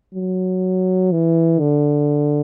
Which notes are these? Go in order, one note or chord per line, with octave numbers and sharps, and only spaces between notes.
F#3
E3
D3